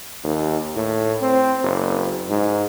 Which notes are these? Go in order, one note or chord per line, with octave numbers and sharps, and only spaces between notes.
D#2
A2
C4
F#1
G#2